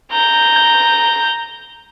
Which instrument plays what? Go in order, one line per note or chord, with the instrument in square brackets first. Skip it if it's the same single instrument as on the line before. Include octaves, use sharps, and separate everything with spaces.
[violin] A#5 G6